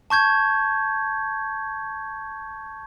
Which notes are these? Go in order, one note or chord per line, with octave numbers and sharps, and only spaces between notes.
A5 C#6 G6 G#6